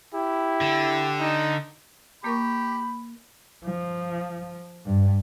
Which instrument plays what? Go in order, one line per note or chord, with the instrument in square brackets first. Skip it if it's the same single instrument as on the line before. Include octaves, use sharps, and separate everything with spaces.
[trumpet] E4 [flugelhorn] G4
[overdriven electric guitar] D3
[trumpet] D#4
[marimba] A#3 A#4 C#6 [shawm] G4 [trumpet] B5
[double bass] F3
G2